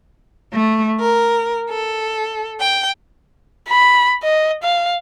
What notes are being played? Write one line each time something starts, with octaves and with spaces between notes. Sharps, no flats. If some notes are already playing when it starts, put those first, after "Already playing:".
A3
A#4
A4
G5
B5
D#5
F5